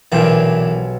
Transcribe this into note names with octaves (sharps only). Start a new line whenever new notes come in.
B1 A#2 D3 E3 G4 G#5